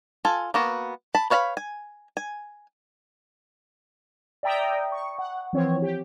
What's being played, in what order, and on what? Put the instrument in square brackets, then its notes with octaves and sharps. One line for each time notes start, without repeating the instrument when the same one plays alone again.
[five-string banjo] F4 A4 G#5
A#3 B3 F#4
A5 B5
B4 C#5 F5 A5 B5
G#5
G#5
[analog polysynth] D5 E5 G5 A#5 D#6
C#6
F#5
E3 F3 C4 C#5
G4